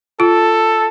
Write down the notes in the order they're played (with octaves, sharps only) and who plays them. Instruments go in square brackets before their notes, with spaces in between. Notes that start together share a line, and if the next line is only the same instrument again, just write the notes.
[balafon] F4 [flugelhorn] A4